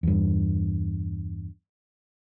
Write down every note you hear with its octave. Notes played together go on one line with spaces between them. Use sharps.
E2 G2